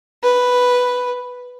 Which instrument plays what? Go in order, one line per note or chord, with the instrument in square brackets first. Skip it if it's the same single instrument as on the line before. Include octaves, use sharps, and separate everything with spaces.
[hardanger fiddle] B4